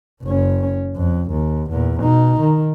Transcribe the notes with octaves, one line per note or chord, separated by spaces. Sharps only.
F#1 C#4
F2
D#2
E2 A#2
B2 D#4
D#3